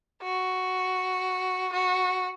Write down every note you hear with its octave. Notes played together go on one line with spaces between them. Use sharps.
F#4
F#4